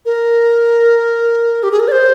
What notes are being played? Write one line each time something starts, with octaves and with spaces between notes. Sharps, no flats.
A#4
G4
G#4
A#4
D5
C5